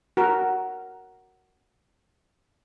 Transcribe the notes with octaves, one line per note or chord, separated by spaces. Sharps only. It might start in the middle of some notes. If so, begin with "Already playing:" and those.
F#4 A#4